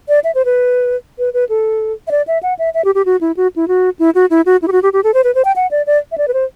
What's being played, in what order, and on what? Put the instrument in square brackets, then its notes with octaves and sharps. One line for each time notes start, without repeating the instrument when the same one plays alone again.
[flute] D5
E5
C5
B4
B4
B4
A4
E5
D5
E5
F#5
E5
E5
G4
G4
F#4
E4
F#4
E4
F#4
E4
F#4
E4
F#4
E4
G4
F#4
G4
G4
A4
C5
B4
C5
G5
F#5
D5
D5
E5
D5
B4
C5